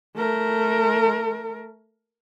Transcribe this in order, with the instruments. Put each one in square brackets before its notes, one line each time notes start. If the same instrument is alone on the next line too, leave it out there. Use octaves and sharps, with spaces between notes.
[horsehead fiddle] A3 A#4